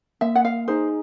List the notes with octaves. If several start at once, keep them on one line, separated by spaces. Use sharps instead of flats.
A#3 E5
F#5
F5
D#4 G#4 C5